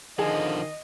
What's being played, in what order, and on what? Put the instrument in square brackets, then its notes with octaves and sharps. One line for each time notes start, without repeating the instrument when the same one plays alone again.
[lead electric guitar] D3 F3 [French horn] D#3 [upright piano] G#4 [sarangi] D#5